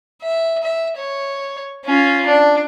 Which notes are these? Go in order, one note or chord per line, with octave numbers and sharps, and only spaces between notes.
E5
E5
C#5
C#4 F4
D4